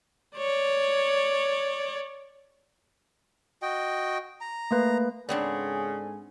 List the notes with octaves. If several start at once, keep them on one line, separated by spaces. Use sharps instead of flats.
C#5 D5
F#4 D#5 G5
A#5
A3 A#3 B4
G#2 C#3 B3 C4 D4 A4 D5 G#5